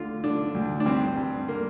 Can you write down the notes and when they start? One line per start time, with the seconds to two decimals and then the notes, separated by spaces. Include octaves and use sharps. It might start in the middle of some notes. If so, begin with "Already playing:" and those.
Already playing: D2 D3 F4
0.24 D3 D4
0.55 D2
0.80 D4
0.86 G2 C4
1.17 G2
1.48 D3 A#3